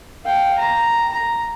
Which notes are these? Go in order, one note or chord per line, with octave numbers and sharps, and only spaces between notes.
F5 G5
A#5
A#5